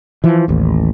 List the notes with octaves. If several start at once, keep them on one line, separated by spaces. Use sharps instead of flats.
E3 F3
A1 D#2